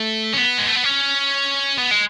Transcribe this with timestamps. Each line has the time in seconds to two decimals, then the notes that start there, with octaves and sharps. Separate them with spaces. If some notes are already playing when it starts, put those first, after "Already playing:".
Already playing: A3
0.33 C#4
0.38 B3
0.58 G#3
0.67 A3
0.76 B3
0.84 C#4
1.78 B3
1.91 G#3